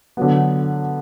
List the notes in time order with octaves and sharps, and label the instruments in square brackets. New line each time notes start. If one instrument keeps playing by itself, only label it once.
[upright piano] D3 F#3 B3